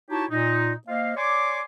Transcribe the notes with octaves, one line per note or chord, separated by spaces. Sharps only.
D#4 E4 F#4 G4 C#5 A5
A#2 D#4
A#3 C5 D#5 F5
C#5 D5 G#5 C6 D6